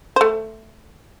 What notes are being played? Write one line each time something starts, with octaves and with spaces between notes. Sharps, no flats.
A3 C5